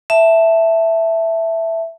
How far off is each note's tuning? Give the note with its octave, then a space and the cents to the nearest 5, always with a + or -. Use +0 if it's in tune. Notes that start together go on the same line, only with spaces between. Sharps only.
E5 +0 A5 +0